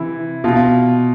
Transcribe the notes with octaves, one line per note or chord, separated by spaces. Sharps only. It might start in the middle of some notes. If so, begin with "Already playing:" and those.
Already playing: C3 E3 E4
B2 F4